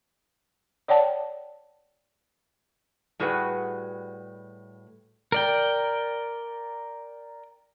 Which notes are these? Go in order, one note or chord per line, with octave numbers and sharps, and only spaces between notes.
C#5 D5 F#5 G5 A5
A2 G3 F#4 G#4 B4 F#5
A#4 D5 G5